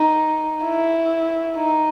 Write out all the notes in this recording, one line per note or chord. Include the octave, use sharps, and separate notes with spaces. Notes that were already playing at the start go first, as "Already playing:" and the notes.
Already playing: D#4
E4
D#4